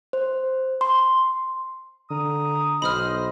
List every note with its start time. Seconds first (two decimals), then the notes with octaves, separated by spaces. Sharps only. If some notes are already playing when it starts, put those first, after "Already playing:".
0.13 C5
0.81 C6
2.10 D3 A#5 D#6
2.82 B1 C5 D#5 B5 D#6 F6